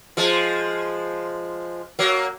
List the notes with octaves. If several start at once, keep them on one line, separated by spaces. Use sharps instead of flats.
F3 G#3
F#3 A#3